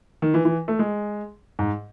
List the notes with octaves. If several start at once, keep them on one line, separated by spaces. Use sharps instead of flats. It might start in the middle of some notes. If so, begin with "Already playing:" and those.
D#3
E3
E3
A3
G#3
G#2